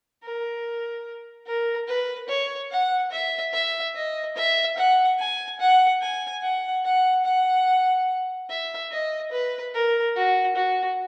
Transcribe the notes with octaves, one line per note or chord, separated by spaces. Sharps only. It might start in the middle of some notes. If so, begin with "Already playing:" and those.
A#4
A#4
B4
C#5
F#5
E5
E5
D#5
E5
F#5
G#5
F#5
G#5
F#5
F#5
F#5
E5
D#5
B4
A#4
F#4
F#4